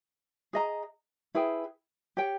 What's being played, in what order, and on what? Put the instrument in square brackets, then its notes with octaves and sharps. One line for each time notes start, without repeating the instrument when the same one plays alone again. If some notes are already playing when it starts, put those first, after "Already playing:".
[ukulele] G#4 D#5 A#5
E4 G#4 B4 G5
G4 C#5 G5